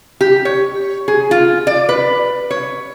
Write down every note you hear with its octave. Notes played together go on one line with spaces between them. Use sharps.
G4
C#5
G#4
F4
D5
B4
C#5